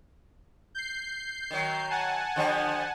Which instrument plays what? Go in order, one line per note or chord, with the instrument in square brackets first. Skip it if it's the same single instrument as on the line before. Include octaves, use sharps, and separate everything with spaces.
[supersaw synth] G6 C7
[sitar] D#3 F#3
[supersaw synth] F#5 G#5 A5
[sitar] D3 F3 G3